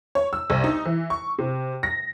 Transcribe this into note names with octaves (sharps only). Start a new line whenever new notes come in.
C#5
E6
C2
D#4
E3
C#6
C3
A#6